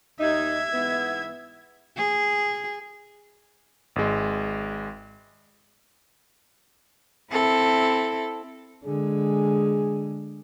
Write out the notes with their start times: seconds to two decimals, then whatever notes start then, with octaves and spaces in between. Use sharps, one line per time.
0.20 D#2 D#4 E5 G#6
0.73 G#2 E3 B3
1.97 G#4
3.96 G#1 G#3
7.32 C4 E4 A4
8.85 D3 G#3 G#4